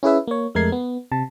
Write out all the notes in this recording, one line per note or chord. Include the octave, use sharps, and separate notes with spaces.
C#4 E4 G#4 B4 E5
A#3 C#5
F2 G#3 A3 A#4 G#6 C7
B3
C3 A5